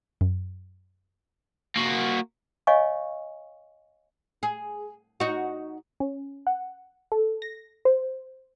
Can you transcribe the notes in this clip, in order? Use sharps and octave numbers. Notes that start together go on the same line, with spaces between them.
F#2
A#3 F#4
C#5 D#5 F5 G#5 C#6
G#4
D#4 F#4
C#4
F#5
A4
A#6
C5